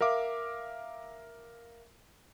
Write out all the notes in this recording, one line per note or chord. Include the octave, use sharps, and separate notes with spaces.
A#4 E5 F5 D6